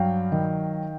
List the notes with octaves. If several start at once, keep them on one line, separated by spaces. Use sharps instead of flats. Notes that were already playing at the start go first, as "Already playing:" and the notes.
Already playing: G2 F#3 F5 G5
D#3